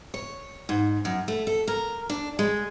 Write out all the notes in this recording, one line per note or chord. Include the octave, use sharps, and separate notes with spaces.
C#5
G#2
F#2
A3
A4
A#4
D4
G#3